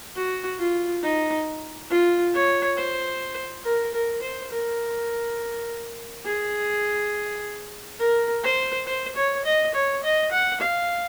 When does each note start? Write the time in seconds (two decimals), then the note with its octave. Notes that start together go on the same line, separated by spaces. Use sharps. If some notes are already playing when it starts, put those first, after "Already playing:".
0.16 F#4
0.59 F4
1.03 D#4
1.91 F4
2.34 C#5
2.77 C5
3.64 A#4
3.94 A#4
4.22 C5
4.51 A#4
6.26 G#4
7.99 A#4
8.43 C5
8.86 C5
9.16 C#5
9.45 D#5
9.74 C#5
10.03 D#5
10.32 F#5
10.60 F5